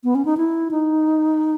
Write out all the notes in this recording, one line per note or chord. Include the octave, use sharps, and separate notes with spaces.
B3
C#4
D#4
E4
D#4